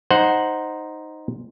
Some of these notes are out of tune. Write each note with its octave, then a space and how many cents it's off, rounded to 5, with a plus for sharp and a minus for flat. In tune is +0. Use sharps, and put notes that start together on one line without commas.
D#4 +0 C5 +0 F#5 +0